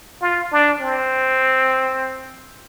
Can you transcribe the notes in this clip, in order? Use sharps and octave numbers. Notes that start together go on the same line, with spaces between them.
F4
D4
C4